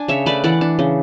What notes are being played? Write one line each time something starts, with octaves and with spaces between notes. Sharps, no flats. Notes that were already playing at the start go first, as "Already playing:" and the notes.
Already playing: D4 G#5
C#3 C#5 E5
A3 B4 D5
E3 D5 F#5
D4
C#3